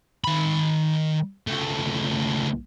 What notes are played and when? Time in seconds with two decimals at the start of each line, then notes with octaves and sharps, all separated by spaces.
0.24 D#3 B5
1.47 C#2 A3